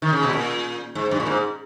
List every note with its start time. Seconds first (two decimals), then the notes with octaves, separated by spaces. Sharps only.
0.02 D#3
0.13 C#3
0.23 B2
0.33 A#2
0.95 G#2
1.11 G2
1.20 A#2
1.27 G#2